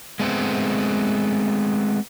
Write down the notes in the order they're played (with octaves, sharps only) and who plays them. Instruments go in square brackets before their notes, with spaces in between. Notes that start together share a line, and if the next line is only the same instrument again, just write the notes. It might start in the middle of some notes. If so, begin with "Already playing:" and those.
[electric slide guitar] G#3 A3 B3 C4